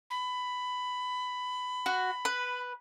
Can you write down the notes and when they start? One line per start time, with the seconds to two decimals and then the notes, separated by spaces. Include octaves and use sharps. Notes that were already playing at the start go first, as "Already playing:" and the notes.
0.10 B5
1.86 F#4
2.25 B4